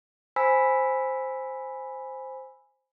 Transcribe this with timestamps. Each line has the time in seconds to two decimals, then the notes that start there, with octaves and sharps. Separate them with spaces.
0.36 C5 G#5 B5 E6 B6